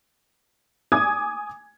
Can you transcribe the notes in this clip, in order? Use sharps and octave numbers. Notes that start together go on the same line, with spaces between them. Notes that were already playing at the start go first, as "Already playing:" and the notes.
G#5 D6 D#6 G#6